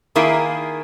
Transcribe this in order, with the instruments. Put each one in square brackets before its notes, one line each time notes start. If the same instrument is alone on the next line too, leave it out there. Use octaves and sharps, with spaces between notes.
[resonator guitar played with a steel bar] D#3 A#3 E4 G#4